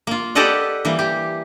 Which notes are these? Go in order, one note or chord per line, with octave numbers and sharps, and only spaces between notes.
A#3 F4
G4 A4 B4 D5 D#5 F#5
E3 G3 A#3
G4